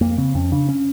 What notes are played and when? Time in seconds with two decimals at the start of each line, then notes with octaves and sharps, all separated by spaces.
0.01 F2 A#3
0.18 C#3 C4
0.35 F2 C#4
0.52 C#3 D4
0.69 C#4